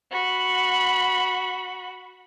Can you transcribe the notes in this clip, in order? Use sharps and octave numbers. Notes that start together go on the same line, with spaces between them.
F#4 B5